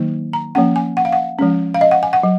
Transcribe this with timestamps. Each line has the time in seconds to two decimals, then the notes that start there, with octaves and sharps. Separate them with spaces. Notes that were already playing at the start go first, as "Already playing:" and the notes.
Already playing: D#3 F#3 A#3 D#4
0.33 A#5
0.55 F3 A#3 C#4 F#5
0.76 G#5
0.97 F#5
1.05 F5
1.12 F#5
1.39 F3 G#3 C#4
1.74 F5
1.81 D#5
1.91 F#5
2.03 G#5
2.13 F#5
2.23 F#3